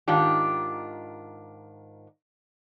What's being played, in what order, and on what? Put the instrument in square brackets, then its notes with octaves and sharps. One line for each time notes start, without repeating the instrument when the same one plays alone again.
[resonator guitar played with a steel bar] G#2 D#3 D4 F4 G4